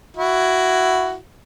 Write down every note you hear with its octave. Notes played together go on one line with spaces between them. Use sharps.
E4 F#4